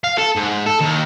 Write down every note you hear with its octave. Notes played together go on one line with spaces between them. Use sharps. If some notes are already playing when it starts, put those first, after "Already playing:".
F5
A4
G#2
A4
D#2